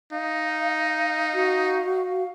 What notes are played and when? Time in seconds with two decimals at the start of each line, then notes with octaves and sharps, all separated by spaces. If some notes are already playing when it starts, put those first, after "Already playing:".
0.12 D#4 F5
1.34 F#4